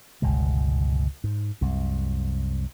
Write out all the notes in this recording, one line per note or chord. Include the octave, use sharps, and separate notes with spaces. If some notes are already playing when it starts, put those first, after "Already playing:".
G1 C#2 B2 G#3
G#2
C2 F#2 C3